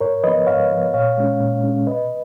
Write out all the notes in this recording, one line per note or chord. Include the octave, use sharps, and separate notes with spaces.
G#2 A#4 C#5
F3 B3 B4 D#5
G#2 C#5 F5
F3 B3
A#2 C#5 F5
G#3 C#4
A#2
G#3 C#4
B2 B4 D#5